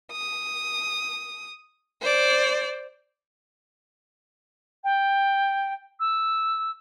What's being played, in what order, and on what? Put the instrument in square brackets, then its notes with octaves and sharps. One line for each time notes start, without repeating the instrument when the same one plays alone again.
[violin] D#6
C5 D5
[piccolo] G5
E6